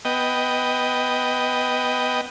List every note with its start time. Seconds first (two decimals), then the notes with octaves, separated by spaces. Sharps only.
0.05 B3 D#5 G5